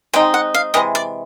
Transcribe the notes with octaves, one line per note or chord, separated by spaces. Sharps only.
G#3 C4 D#4 G5
F#5
F5
C3 E3 G#3 D#5
D5